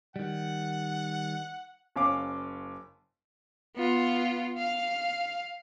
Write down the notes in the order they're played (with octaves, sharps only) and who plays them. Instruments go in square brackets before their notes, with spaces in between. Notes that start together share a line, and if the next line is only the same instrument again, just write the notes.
[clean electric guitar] D#3 G3 [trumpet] F#5
[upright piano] F#1 C#4 F5 D6
[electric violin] B3 F4
F5